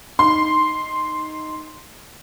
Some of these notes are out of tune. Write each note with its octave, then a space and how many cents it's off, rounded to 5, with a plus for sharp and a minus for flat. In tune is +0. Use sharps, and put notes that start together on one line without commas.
D#4 +0 C6 +0